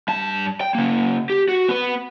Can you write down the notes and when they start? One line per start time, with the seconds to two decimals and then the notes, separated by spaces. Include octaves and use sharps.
0.08 G2 A5
0.61 G5
0.75 C#3 A#3
1.30 G4
1.49 F#4
1.68 B3 B4